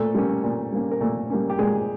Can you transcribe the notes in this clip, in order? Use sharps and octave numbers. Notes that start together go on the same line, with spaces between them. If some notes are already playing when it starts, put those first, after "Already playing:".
Already playing: A#2 A3 A4
G3 A#3 C#4
A#2
G3 A#3 C#4
A#4
A#2 A3 A4
G3 A#3 C#4
G4
A#2 G#3 G#4